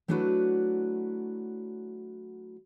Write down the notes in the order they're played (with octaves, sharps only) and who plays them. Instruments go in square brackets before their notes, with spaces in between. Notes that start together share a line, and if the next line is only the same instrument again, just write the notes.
[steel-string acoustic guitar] F#3 A3 D4 E4 F#4 B4